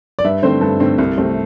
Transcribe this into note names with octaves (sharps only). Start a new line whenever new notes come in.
D5
G2 E5
D3 A3 C4 C5
G2 A4
D3 A3 C4
C2
C3 A3 C4